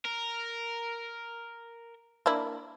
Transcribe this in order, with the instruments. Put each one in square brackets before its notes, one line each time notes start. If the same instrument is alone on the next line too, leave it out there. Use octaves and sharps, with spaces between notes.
[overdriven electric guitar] A#4
[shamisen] A#3 D4 E4